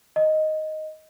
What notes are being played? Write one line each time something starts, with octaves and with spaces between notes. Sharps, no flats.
D#5